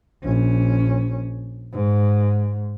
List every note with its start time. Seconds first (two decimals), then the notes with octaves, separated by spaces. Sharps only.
0.23 A#1 C#4
1.73 G#2